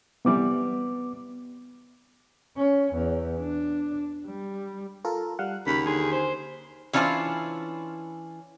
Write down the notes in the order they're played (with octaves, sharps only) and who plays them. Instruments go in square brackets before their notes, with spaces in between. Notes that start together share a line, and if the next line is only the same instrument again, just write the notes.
[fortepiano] C3 E3 G3 [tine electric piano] B3 D6
[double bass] C#4
E2
D4
G3
[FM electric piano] F4 A4 A#4
G3 F5 F#5
[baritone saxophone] D#2 [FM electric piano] C#3 [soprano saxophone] B5
[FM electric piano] D3 G#5 C6 [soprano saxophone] G#4
[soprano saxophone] C5
[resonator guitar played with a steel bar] E3 C#4 D4 F4 C5